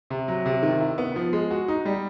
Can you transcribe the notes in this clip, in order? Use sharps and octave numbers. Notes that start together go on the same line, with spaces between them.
C3
F#3
C3
D#3
E4
B3
F3
G#3
F#4
D#4
G3